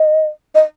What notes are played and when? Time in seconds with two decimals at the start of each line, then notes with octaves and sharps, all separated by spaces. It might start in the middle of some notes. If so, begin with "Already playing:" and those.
Already playing: D#5
0.55 D#5